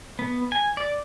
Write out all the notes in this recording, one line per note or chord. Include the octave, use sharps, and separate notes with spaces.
B3
G#5
D5